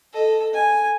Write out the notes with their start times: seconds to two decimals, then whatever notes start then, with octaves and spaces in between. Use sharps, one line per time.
0.13 A4 D#5
0.54 G#5